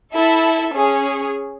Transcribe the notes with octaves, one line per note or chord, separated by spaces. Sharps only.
E4 A4 E5 A5
C#4 G#4 C#5